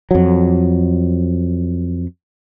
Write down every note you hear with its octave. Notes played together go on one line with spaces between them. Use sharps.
F2 F#3